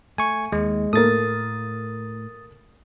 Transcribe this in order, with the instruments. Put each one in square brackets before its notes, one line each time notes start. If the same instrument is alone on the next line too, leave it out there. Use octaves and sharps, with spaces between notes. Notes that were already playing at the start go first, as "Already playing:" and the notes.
[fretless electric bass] A3 [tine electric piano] G#5 C#6
[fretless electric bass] D#2 [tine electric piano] G#3
[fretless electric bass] A2 [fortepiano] A3 A#3 [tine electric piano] D#6 A6